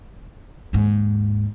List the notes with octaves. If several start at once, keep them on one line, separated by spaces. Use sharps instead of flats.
D#2 G#2